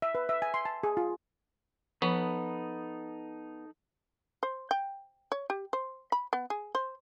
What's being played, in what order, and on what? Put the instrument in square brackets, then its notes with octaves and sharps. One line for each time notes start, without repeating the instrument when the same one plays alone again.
[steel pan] E5
B4
E5
G#5
C6
A5
G#4
F4
[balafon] F3 [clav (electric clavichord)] B3 [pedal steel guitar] D#4 A4 B5
[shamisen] C5
G5
C#5
G4
C5
B5
B3
G#4
C5